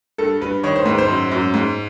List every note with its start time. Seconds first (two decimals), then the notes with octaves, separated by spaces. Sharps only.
0.18 G2 A4
0.41 G2 B4
0.64 D#3 C#5
0.76 C5
0.86 G#2 B4
0.98 C5
1.08 F#2
1.31 F#2
1.54 G#2